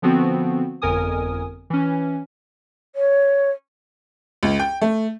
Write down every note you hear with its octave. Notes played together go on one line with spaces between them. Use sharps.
D3 F3 B3 C4 F#4
G1 F2 A#4 G#5 D#6
E3 C#4
C#5
C#2
G5
A3